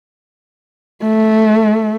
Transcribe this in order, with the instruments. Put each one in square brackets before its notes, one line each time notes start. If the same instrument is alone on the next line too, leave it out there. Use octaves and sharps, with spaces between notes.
[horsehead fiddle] A3